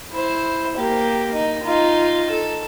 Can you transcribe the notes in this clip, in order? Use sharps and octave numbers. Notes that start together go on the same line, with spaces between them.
E4 C5
A#3 G4
D#4
D#4 F4
A4